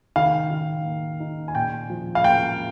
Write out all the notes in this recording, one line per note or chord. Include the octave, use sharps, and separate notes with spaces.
D#3 F5
D#3
A#3
D#4
G#5
A#2 G5
F3
F5
A#3 G5